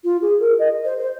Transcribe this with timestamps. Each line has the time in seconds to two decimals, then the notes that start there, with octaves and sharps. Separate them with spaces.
0.04 F4
0.22 G#4
0.40 A#4
0.59 D#5
0.85 C5
0.98 C5